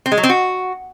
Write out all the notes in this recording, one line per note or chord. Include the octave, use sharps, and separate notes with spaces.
C4
G#3
F#3
C4
F#4